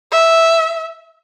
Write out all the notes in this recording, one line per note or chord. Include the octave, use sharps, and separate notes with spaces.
E5